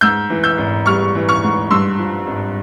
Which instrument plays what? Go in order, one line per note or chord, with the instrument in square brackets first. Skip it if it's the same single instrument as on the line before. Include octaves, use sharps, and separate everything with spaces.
[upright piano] G#2 E6 G6
E3
E6 G6
G#1
G3 C#6 F6
E3
C#6 F6
G#2
G2 C6 E6
F3
G#1